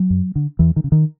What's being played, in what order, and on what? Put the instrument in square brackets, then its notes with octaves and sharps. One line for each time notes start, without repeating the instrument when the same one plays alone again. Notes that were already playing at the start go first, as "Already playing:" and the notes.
Already playing: [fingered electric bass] F#3
F#2
D3
E2 E3
D#3
C#3
D#3